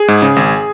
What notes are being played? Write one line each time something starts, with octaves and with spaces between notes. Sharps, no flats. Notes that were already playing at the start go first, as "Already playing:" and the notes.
Already playing: G#4
G#2
C#3
G#1